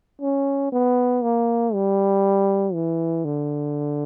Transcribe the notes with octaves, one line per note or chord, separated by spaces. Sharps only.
C#4
B3
A#3
G3
E3
D3